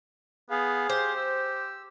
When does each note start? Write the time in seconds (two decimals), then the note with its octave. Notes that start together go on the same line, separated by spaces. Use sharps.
0.50 B3 G#4 F5
0.89 G4 C5
1.17 E6